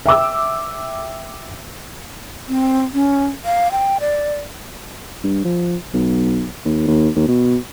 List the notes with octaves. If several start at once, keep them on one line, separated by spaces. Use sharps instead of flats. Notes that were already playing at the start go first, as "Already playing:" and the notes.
E5 G5 D6 E6
C4
C#4
F5
G5
D5
G2
F3
B1
D#2
D#2
D#2
B2